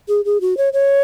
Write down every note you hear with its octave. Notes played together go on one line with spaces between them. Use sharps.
G#4
G#4
F#4
C#5
C#5